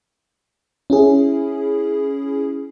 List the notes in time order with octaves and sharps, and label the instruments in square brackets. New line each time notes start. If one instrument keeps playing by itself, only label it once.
[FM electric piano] C#4 E4 G#4